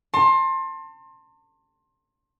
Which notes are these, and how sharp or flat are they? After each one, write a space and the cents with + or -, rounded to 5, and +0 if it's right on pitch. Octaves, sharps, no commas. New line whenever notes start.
A5 +40 C6 +25